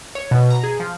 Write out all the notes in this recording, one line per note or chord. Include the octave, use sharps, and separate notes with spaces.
C#5
B2
A#5
G#4
F3